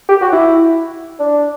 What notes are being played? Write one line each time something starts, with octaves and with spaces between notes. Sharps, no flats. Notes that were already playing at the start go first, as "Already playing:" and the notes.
G4
F#4
E4
D4